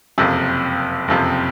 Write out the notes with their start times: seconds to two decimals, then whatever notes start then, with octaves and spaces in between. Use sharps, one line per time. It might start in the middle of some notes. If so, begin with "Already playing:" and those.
0.18 F#1 F2 C3
1.08 F#1 F2 C3